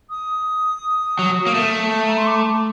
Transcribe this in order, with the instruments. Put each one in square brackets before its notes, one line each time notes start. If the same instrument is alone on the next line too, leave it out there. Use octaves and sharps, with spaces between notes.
[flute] D#6
[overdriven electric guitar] F#3
A#3
A3
[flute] A#5
C6
D6